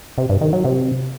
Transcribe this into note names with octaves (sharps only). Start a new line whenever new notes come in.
C3
G2
D#3
F#3
C3